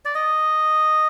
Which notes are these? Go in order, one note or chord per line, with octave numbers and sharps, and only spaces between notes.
D5
D#5